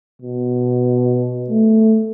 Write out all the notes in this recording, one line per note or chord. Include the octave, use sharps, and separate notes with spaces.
B2
A3